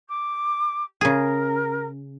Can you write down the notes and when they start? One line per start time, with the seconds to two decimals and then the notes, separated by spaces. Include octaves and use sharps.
0.08 D6
1.01 C#3 G#4 A#4